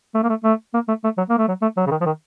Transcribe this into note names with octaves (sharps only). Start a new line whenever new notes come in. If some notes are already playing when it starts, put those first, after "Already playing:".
A3
A#3
A3
A3
A#3
A3
A3
F#3
A#3
A3
F#3
A3
F#3
C#3
D#3
F3
D#3